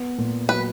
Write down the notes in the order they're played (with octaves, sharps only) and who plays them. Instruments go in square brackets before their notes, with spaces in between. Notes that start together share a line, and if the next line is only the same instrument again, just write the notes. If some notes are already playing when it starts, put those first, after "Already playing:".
Already playing: [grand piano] B3
A#2
[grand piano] F#3 [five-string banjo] B4